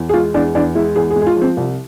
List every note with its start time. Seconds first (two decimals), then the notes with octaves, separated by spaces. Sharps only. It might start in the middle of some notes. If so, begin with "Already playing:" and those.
Already playing: E2
0.09 G#4
0.14 G#3 F4
0.34 E2 D4
0.55 E2 D4
0.75 G#3 E4
0.96 E2 G#4
1.10 G#4
1.16 G#3
1.22 G#4
1.27 F4
1.36 F3
1.41 C4
1.57 C2